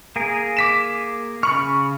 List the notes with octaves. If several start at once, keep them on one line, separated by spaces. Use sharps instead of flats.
A#3 G#4 A#4
D6 B6 E7
C#3 B5 C#6 F6